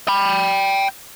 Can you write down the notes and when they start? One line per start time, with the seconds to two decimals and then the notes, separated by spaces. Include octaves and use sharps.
0.08 G5 B5